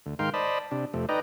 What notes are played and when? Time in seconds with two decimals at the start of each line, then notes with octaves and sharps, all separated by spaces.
0.06 D2
0.19 G#2 D#3 A#4 F5 G5 C6
0.34 C5 D5 D#5 A5 B5
0.71 C3 D4
0.94 F2 C3 A3
1.09 D#4 B4 D5 D#5 G5 A#5